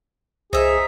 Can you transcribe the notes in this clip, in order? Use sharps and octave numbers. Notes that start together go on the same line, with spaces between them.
C2 D#4 G#4 C5 E5